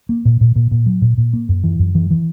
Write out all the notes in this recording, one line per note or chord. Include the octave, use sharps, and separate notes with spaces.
A#3
A#2
A#2
A#2
A#2
F#3
A#2
A#2
A#3
F#2
E3
F#2
E3
E3